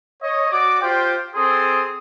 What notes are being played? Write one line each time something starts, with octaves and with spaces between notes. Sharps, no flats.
C#5 D#5
F#4 D5 D6
F4 G4 C5 G5
C4 G#4 A4 C6 D#6